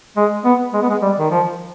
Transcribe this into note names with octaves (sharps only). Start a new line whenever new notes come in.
G#3
B3
G#3
B3
G#3
G3
D#3
F3